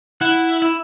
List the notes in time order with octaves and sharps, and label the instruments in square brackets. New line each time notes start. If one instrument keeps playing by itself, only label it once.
[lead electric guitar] E4 [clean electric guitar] F#5
[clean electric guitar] E4